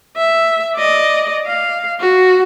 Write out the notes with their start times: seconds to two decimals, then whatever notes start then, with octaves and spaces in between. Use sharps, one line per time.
0.17 E5
0.76 D5 D#5
1.47 F5
2.00 F#4